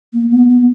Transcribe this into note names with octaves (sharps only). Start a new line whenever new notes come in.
A#3
B3
B3